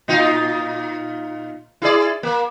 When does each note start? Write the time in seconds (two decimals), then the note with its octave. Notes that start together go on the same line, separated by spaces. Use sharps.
0.08 A#2 D#4 F4
1.82 E4 G#4 D5
2.23 A#3